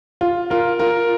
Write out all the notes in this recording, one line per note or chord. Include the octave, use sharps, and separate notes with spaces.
F4
F4 A#4
F4 A#4